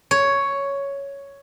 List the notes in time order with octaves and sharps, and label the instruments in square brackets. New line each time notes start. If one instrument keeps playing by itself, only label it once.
[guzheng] C#5